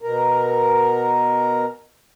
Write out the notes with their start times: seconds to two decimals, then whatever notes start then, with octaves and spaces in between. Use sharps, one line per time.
0.02 B2 A#4